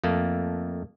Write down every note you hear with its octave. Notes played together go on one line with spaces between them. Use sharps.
F2 A3 A#3